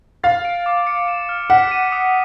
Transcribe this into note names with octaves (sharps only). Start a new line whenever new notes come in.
F5 A6
D7
D6
C#7
E7
F6
F#5 B6
D#7
D#6